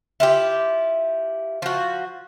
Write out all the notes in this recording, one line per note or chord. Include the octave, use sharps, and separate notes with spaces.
E4 F4 G4
F3 F#4